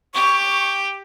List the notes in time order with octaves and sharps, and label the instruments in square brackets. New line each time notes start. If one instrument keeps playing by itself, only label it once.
[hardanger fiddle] G4 [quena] C#6